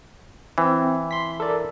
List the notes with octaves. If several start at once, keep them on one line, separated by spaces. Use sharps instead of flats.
E3 C4
C6 B6
A4 A#4 D5